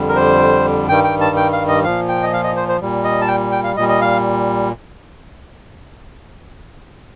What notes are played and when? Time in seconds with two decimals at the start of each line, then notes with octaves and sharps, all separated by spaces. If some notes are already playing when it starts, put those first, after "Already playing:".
Already playing: F2 D3 G3
0.09 A#4
0.16 C5
0.89 G2 D#3 G3 G5
1.04 G5
1.20 A5
1.36 G5
1.52 F5
1.68 D#5
1.84 A#2 F3 F5
2.09 G5
2.23 D#5
2.33 F5
2.44 D#5
2.57 C5
2.69 C5
2.81 A#2 G3
3.04 D#5
3.21 A5
3.28 G5
3.52 G5
3.64 F5
3.76 A#2 D#5
3.80 G3
3.88 D#5
4.01 F5